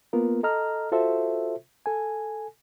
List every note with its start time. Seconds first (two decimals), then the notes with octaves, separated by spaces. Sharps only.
0.13 A#3 B3 F4 A#4
0.43 A4 D#5 A#5 F6
0.92 F4 F#4 A4 C5 E5
1.86 A4 G#5